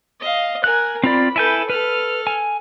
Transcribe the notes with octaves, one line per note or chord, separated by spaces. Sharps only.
D#5 F5
A#4 G#5 F#6
C4 F4 D5 B5
E4 A4 B4 G#5 G6
A4 B4 F6
G#5